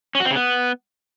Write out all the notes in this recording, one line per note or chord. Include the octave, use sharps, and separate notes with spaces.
C#4
F#4
C4
C#3
B3